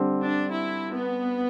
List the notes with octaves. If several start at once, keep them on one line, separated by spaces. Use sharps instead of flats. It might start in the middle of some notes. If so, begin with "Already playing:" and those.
Already playing: D3 G3 C4
D4
E4
B3